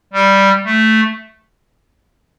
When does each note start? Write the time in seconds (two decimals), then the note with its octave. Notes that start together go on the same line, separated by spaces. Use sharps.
0.13 G3
0.65 A3